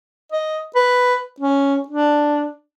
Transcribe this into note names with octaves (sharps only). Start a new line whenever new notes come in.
D#5
B4
C#4
D4